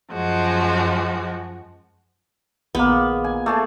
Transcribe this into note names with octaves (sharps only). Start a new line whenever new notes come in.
F#2 F3 G#3 F#4
A#1 D#3 G#3 A#3 B3 G#4
G#5
A3 G#4 A5 D6